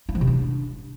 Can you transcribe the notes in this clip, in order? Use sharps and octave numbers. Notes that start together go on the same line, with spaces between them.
E4
F3
C3
D4